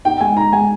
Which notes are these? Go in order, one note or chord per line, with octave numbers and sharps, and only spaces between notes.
D#4 G5
G#3 G#5
D#4 A#5
G#3 G#5